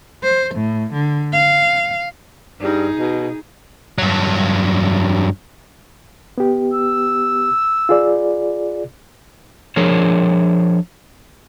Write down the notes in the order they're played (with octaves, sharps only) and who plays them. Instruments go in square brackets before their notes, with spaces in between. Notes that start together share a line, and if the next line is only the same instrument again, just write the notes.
[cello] C5
A2
D3
F5
[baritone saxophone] G2 [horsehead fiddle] D#4 G#4
[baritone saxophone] B2
[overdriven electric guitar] G2 F#3
[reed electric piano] B3 G4
[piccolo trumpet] E6
[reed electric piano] F4 G#4 D5
[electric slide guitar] F3 D4 G#4 A#4 C#5